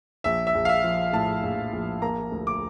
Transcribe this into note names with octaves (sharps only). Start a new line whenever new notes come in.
A#1 E5
E5
A#1
F5
E5
F3
A2 A5
A#1
A#1
A#3 A#5
D2
D6